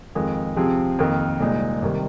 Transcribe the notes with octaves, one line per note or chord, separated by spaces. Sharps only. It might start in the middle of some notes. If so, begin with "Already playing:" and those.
F2 D#3 G#3
C3 F3 C4 G#4
F2 D#3 A#3
C2 A#2 G#3 D#4
C2 C3 D#3